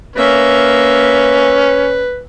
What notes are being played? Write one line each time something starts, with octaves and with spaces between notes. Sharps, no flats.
A#3 C#4 B4 E5